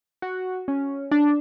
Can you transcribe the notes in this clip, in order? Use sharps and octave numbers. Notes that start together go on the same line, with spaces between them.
F#4
C#4
D4